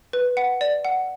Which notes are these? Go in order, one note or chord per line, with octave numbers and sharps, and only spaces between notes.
B4
F#5
D5
F#5